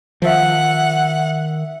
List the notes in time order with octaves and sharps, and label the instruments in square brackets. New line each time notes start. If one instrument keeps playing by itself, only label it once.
[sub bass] D#3 [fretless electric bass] F3 [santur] E5 C#6 D#6 [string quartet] F#5